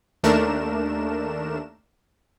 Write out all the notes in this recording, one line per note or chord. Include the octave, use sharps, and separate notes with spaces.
D#2 A3 D4 A#4 E7